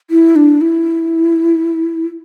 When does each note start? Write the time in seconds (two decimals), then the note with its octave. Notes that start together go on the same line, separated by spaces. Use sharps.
0.10 E4
0.36 D4
0.61 E4